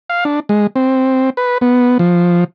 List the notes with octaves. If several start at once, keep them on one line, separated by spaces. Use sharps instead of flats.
F5
D4
G#3
C4
B4
B3
F3